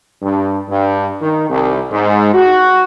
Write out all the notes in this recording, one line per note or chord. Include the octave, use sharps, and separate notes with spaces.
G2
G2
D#3
C2
G#2
F#4